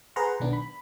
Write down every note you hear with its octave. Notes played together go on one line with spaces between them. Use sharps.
G#4 B4 C5 F#5 A#5 C6
B1 B2 D#3 B3 D4
B5